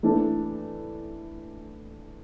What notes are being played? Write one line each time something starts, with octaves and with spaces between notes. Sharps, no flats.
E3 A3 D4 A4